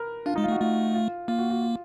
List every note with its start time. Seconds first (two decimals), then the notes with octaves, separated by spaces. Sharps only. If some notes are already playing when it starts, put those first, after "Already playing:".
Already playing: A#4 B4
0.26 D4 F4
0.36 G#3 D#4
0.43 F4
0.48 A3
0.52 F#4
0.60 A3 F4
0.94 F4
1.28 A#3 F4
1.38 F#4
1.50 F#4
1.62 F4